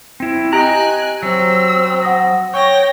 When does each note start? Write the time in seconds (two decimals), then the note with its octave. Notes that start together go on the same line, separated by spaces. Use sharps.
0.20 C4 E4
0.53 G4 D#5 G5 G#5 A#5 F#6
1.23 F#3 C4 E6
2.03 F#5 D#6 A#6
2.54 C#5 G5 C#6 A#6